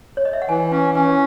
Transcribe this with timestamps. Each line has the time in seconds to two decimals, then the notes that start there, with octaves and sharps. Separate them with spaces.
0.17 C#5
0.25 D#5
0.33 E5
0.42 F#5
0.49 E3 G#5
0.72 C#4 G#5
0.95 C#4 G#5